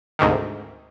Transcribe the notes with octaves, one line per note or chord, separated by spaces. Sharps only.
D2 G#2 C3 D#3